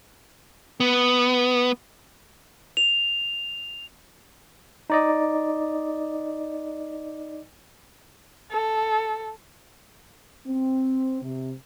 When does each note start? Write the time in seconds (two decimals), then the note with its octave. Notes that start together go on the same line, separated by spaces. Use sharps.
0.80 B3
2.77 F7
4.90 D#4 D5 D#5
8.51 A4
10.46 C4
11.21 C3